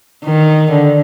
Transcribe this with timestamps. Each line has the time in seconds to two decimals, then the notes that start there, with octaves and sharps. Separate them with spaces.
0.24 D#3
0.71 D3